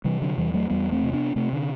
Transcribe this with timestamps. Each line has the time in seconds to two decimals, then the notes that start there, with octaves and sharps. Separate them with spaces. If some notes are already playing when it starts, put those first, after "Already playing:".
0.04 C3 E3 G3
0.22 D3 F#3
0.37 E2 E3 G3
0.54 F#3 A3
0.70 E2 G3 B3
0.92 A3 C4
1.03 C3
1.13 B3 D4
1.36 C3 A3 C4
1.53 D3